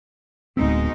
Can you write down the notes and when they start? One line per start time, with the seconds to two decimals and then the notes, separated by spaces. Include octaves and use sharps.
0.57 D1 B2 G#3 A3 C4 D#4